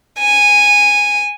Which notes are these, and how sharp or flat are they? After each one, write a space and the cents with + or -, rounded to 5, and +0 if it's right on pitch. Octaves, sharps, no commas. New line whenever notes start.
G#5 -10